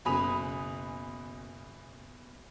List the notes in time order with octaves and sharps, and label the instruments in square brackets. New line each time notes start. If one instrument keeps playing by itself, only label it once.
[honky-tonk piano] F#1 B2 G#5 B5 D#6 F7